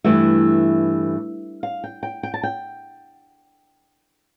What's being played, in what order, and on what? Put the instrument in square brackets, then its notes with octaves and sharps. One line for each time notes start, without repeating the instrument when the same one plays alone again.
[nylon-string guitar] G2 E3 A3 E4 E5
F5
G5
G5
G5
A5
G5